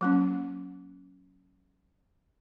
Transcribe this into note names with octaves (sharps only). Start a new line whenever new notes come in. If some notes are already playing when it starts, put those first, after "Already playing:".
F#3 A#3 C#4